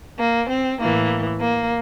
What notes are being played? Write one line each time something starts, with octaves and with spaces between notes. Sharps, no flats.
A#3
C4
A2 E3 A#3
A#3